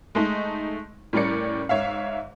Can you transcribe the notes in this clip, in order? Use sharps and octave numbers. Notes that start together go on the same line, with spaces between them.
G#3 A3 D#4
A2 G3 C#4 A#4 D5 C#7
G#2 C#5 E5 F5